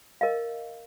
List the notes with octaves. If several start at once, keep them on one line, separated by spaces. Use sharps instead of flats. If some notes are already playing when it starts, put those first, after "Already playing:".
A#4 D#5 F5